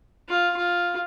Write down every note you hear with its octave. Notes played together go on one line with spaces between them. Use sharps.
F4
F4